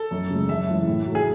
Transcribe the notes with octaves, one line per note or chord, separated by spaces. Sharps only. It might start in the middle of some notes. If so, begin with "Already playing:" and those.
Already playing: A4
F#2
C#3 G#3
F#2 E5
C#3 E3 G#3
A2
F#3 A3
G#4